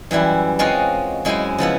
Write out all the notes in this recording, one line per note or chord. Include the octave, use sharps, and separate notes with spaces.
F#2 E3 G3 E4
G#3 C4 F4 F#4 C#5 D#5
F#2 G#3 E4 G#4 C5 G#5
C#3 F3 B3 E4